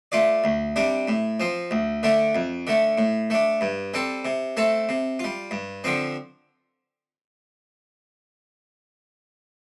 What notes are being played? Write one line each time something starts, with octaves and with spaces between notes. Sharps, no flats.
A3 F4 D5
D2
C3 G3 D4
A2
F3 C4
D2
D3 A3 D4
F2
D3 A3
A2
A3 D4
G2
G3 C4 A4
C3
A3 C4 A4
C3
G3 F4
G2
D3 F3 C4